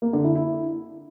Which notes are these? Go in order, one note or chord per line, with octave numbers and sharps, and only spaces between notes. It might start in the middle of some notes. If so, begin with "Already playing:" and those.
A#3
D3
E4
E4